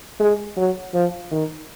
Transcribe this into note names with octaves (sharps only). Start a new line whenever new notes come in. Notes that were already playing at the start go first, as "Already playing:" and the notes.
G#3
F#3
F3
D#3